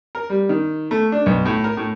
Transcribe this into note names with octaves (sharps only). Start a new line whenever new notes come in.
A#4
G3
D#3
A3
D4
B1
A2
A#4
A2